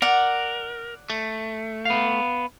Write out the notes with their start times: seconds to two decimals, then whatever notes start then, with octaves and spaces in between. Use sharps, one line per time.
0.02 A#4 D5 F#5
1.10 A3
1.85 B3 F5